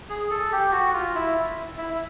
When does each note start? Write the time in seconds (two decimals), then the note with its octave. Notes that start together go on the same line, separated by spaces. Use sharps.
0.09 G#4
0.30 A4
0.52 G4
0.72 F#4
0.94 F4
1.15 E4
1.77 E4
1.94 E4